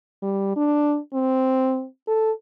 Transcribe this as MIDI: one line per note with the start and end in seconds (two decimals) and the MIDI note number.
0.23 0.54 55
0.56 0.98 62
1.14 1.86 60
2.08 2.31 69